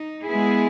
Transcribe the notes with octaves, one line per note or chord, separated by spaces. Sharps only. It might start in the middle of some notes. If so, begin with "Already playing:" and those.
Already playing: D#4
G#3 B3 E4 G#4